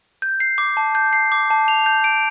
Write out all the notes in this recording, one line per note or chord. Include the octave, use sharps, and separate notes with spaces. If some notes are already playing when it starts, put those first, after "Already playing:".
G6
C7
D6
A5
G6
C7
D6
A5
F7
G6
D7